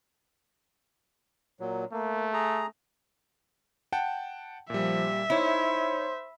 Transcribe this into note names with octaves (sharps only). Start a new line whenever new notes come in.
A#2 F#3
A3 A#3
G#4 A#5
F#5 G5 A5
A#2 F3 G3 E5
D#4 E4 C5 C#5